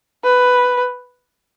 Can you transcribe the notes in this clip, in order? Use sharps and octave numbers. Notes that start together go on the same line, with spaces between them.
B4